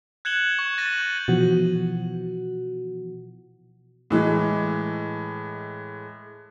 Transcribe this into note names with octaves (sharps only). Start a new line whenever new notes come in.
F#6 G#6 C#7 E7 F#7 G7
C#6
C#6 A6 A#6 D#7 F#7
G6 F#7
B2 E3 F3 F#4
A2 E3 G#3